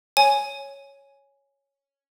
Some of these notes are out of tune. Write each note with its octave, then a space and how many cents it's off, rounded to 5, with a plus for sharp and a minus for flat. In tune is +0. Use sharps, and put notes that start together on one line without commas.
C#5 +0 G#5 +0